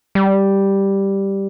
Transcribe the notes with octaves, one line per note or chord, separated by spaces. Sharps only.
G3